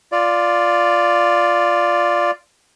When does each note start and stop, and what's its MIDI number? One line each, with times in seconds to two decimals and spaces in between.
0.12 2.31 65
0.12 2.31 74